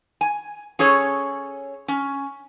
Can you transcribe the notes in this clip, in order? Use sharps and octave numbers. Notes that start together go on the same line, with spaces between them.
G#5
C#4 G#4 A4 C#5
C#4